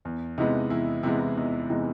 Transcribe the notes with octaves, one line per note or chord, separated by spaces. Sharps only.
E2
C3 E3 G#3 B3 D#4
E2 E4
C3 E3 G#3 B3 E4
E4
E2 D#4
C3 E3 G#3 B3 D#4